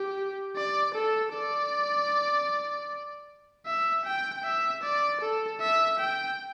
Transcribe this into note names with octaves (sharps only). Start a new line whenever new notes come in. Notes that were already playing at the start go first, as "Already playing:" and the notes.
Already playing: G4
D5
A4
D5
E5
G5
E5
D5
A4
E5
G5